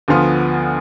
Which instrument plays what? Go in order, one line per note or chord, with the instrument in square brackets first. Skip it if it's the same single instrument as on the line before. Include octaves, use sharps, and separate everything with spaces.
[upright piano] D2 D3 F3 B3 F4